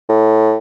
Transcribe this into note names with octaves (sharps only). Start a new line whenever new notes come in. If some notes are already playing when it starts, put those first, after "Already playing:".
A2